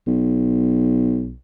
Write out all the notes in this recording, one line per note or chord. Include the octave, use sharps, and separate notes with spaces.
B1